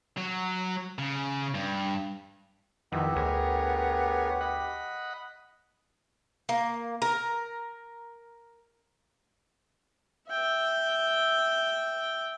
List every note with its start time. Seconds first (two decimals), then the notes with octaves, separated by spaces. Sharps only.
0.17 F#3
0.99 C#3
1.55 G2
2.92 F2 D#3 B3 D#4 E4 G4
3.16 D2 G#4 A#4 C#5
4.41 D#5 F#5 B5
6.49 A#3
7.02 A#4
10.29 E5 G5